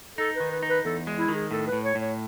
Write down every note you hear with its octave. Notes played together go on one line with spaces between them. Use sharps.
D#4 A4
D#3 B4
B4
D#4
B4
E2 A4
G#3
E4
D#3
G#4
A2 A4
B4
A2
C#5
A2
C#5